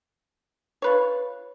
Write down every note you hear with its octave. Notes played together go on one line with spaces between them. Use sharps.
F4 B4 C#5